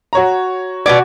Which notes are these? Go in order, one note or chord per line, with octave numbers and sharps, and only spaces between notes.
F#4 C#5 A#5
B2 B3 F#4 D5 G#6